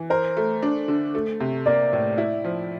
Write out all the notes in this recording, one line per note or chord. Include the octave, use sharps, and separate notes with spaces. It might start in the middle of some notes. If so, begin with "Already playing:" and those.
Already playing: E3
A#4 C5
A3
D4
D3
A3
C3
A#3 D5
A2
E4
F3